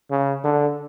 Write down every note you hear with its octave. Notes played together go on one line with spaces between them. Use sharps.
C#3
D3